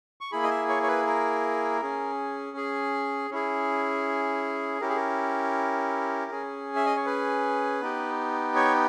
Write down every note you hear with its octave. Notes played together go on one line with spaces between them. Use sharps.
C#6
A#3 E4 G#4 B5
D#5
E5
C#5
C#5
B4
A#4
C#4 G#4
G#4
C#4 E4 G#4
C#4 E4 G4 A#4
G#4
A#4
C#4 G#4
E5
D#5
C#5
B4
B3 D#4 G4
C#5